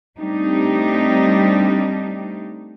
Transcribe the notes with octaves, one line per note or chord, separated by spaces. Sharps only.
G3 A3 C4 D4 D#4 G4